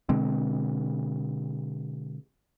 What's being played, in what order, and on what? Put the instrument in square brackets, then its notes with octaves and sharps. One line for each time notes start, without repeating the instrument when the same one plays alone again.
[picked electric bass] B2 D3 G#3 C4